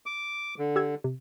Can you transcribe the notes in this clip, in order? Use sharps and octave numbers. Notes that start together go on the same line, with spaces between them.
D6
D3
G4 E6 G#6
C3